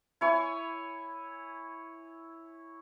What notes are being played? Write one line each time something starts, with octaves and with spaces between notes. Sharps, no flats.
E4 C#5 G#5